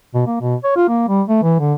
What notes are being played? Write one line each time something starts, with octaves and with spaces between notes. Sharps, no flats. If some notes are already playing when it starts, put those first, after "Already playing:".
B2
A#3
B2
C#5
F4
A#3
G3
A3
E3
D3